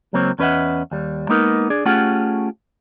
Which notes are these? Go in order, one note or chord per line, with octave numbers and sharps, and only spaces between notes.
C#2 F#3 A#3 C4 C#5
E2 C#4 B4 D#5 E5 F#5
D#2 G3
G#3 A#3 B3 D#4 A#4
D4 G#4 D5
A3 C#4 F4 G4 G#4 F#5